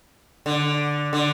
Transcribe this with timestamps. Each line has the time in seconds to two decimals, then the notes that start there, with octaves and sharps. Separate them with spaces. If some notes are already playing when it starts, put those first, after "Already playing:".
0.46 D3
1.13 D3